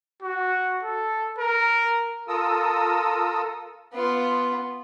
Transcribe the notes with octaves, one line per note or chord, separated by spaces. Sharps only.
F#4
A4
A#4
F4 A4 A#4 D#6 E6
B3 F4